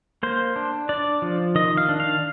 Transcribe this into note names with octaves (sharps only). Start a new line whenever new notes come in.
A#3 C5
D4
D4 D5
F3
D#3 D#5
F5
D4
F5